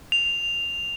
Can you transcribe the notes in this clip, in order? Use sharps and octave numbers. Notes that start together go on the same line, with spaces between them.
F7